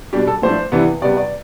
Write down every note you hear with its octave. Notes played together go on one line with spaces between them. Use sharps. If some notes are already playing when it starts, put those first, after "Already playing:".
B2 G3 D4 G4
A4
A2 F3 A3 D4 C5
C3 E3 B3 D4
C3 G3 B3 D5
D5